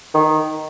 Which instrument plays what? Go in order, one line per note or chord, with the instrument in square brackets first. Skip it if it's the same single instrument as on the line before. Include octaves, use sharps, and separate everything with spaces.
[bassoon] D#3